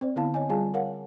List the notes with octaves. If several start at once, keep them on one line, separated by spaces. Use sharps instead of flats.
C4 C5 D5
D3 B3 E4 F5 A5
C#5 D#5 G#5
G3 F4 G#4 F5 G#5 A5
A#4 C#5 F5 F#5